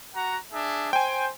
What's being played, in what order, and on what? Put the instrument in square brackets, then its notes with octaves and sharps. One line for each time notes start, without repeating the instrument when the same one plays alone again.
[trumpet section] F#4 F#5 A#5
D4 G#4 E5
[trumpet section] C5 [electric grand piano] G5 G#5